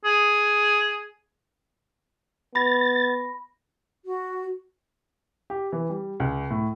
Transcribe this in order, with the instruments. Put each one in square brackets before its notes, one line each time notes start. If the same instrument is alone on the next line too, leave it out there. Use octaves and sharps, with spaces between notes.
[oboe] G#4
[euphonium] B3 [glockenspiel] B5 A#6 [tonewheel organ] A6
[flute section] F#4
[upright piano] G4
E3
G3
C#2
A2